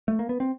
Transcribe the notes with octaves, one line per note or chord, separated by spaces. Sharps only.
A3
A#3
B3
C4